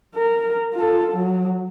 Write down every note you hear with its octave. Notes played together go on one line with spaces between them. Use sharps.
A#4
F4 A4
F#3